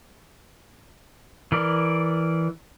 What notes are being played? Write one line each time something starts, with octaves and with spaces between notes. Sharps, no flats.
E3 A#4 D5